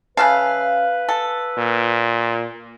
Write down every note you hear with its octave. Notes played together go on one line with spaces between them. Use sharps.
C#3 B4 E5 F5 A5
A4
A#2